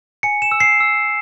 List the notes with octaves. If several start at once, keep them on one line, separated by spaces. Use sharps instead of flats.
G#5 C#7
E7
E6
C7
E6